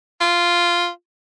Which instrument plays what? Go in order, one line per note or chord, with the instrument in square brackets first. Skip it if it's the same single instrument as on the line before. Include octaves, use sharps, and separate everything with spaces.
[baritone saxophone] F4